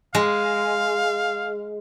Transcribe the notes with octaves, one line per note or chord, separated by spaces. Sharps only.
G#3 F5